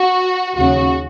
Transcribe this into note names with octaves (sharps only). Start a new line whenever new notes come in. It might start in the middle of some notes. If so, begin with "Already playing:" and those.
Already playing: F#4
D#2 C#3 F#3 F#4